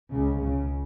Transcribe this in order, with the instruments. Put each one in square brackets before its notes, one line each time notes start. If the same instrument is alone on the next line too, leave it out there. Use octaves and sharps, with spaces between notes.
[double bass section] C#2 C#3
C#2 C#3